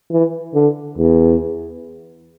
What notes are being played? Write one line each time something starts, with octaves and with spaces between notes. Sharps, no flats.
E3
D3
E2